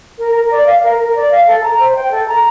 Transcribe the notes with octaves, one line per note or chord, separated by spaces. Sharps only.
A#4
A#4
D5
F5
A#4
A#4
D5
F5
A4
A#5
C5
G5
A4
A#5